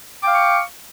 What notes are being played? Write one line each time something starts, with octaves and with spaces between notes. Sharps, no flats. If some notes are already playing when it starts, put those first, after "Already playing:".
F5 G5 C#6 D6